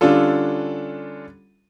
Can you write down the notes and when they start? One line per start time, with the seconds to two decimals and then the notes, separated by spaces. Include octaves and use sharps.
0.01 D3 G3 C#4 D4 F4 A4